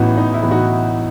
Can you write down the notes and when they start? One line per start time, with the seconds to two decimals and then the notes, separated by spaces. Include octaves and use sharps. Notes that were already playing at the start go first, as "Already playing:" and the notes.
Already playing: A1 A2 E3 B3 D#4 F#4
0.17 A1 D#4
0.34 E4
0.42 A2 E3 B3
0.51 D#4 F#4